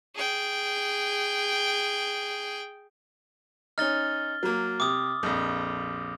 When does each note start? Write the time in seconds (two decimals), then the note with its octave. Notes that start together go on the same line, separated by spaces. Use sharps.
0.15 G#4 G5
3.78 C#4 D#4 F6 A6 G7
4.43 F#3 A#3
4.80 C3 D6 D#6
5.23 A#1 F2